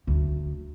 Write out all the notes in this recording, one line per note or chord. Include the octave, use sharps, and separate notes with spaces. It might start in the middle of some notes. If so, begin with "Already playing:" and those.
D2